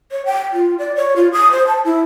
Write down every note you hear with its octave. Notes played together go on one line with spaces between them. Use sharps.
C#5
G5
F4
D5
C#5
F4
D#6
C5
A5
E4